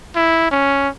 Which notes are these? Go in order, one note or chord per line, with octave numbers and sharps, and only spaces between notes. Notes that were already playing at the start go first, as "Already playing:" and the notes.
E4
C#4